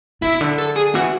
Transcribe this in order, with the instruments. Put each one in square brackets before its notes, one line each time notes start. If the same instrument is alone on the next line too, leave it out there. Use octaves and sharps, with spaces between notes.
[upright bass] B2 [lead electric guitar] E4
[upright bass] D3
[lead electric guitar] A4
G#4
[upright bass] E3 [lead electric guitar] F#4